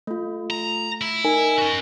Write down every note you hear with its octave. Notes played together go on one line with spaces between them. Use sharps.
A3 F4
A#5
E4
D#4 A#4 G#5
C#4 F#4